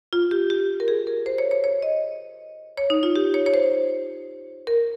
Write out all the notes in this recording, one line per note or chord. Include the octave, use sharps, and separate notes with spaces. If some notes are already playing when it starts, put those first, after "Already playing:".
F4
G4
G4
A#4
G#4
A#4
C5
C#5
C#5
C#5
D#5
C#5
D#4
F4
G4
C#5
C#5
C5
A#4